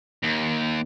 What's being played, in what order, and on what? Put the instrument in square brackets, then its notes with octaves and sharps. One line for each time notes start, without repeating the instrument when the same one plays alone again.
[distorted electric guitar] D#2